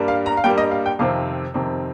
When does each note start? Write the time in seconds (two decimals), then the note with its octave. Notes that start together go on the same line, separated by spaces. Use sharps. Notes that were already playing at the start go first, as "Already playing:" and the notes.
Already playing: G2 G3 A#3
0.08 F5
0.26 A#5
0.37 F5
0.44 G2 G3 A#3 G5
0.58 D#5
0.71 F5
0.86 G5
0.99 F2 C3 D#3 C4 F5
1.54 F2 C3 D#3 C4